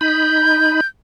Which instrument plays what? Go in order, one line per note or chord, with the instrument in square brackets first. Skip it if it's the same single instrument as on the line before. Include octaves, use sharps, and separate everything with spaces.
[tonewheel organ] D#4 B5 [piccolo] G6